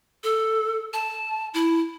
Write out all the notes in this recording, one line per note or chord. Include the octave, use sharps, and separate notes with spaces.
A4
A5
E4